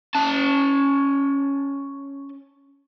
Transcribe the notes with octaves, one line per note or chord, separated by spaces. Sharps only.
C#4 A5